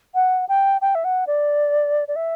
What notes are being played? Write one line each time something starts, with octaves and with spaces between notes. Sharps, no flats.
F#5
G5
G5
E5
F#5
D5
D5
E5